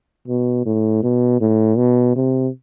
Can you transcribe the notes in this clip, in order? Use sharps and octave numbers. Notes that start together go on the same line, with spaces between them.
B2
A2
B2
A2
B2
C3